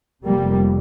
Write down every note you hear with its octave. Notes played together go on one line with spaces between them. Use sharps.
F1 F2 C3 G3 A#3